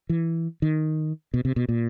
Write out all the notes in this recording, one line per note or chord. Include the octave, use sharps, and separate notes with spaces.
E3
D#3
B2
C3
B2
A#2